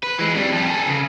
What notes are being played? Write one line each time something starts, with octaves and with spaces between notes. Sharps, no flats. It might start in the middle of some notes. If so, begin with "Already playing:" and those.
B4
E3 G#3
F2 G3
F2 G3
G#4 A4
C#3